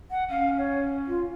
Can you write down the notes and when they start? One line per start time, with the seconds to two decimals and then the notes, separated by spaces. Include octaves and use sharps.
0.11 F#5
0.30 C#4 F5
0.58 C#5
1.08 F4